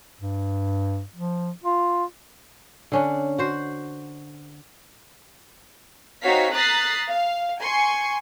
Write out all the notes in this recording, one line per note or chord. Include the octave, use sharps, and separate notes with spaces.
G2
F3
F4
D3 C#4 D4
F#4 C5
C4 D#4 F#4 C#5 F5 B6
A#5 D#6 F#6 A6 B6 C7
F5
G#5 C6 C#6